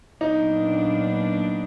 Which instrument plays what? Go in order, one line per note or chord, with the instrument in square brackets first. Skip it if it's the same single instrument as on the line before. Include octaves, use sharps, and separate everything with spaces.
[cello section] A#2 F#3 B3 D4 [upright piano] D#4